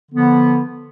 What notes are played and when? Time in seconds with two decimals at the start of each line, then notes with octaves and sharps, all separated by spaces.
0.10 D3 F3 B3